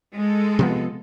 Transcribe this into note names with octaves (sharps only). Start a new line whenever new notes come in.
G#3 A4
C3 F3 B3